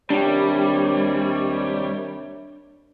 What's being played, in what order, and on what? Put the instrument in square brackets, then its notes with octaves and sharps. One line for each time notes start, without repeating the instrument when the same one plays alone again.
[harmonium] D#2 C3 C#5 [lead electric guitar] G3 [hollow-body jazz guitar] D4 G4